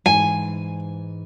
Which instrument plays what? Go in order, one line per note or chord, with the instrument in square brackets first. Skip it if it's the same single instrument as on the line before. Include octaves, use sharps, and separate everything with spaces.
[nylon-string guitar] G#2 E3 [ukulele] G#5